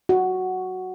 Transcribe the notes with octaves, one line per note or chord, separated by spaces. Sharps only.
F#4